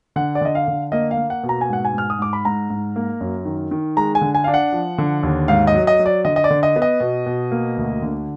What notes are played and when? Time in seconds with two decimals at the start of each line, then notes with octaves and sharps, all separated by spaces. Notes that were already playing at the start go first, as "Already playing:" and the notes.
0.16 D3 F#5
0.35 D5
0.41 D3 D#5
0.55 F5
0.68 D3
0.92 A#3 D#5
1.11 F5
1.17 A#3
1.30 F#5
1.43 B2
1.49 A#5
1.61 G#5
1.69 G#2 F#5
1.85 G#5
1.93 G#2 F6
2.10 D#6
2.19 G#2 D6
2.33 B5
2.45 G#2 A#5
2.70 G#2
2.96 A#3
3.21 F#2
3.45 D#3
3.71 D#3
3.97 G#3 A#5
4.15 G#5
4.21 D3
4.35 G#5
4.44 D4 F5
4.54 F#5
4.72 F3
4.98 D3
5.23 D#2
5.48 G#2 F5
5.67 D#5
5.74 F#3
5.87 D#5
5.99 F#3
6.06 D5
6.25 D3 D#5
6.36 D#5
6.44 D5
6.50 D3
6.63 D#5
6.76 B3
6.82 D#5
7.00 B2
7.26 B2
7.51 A#3
7.77 D2
8.02 D3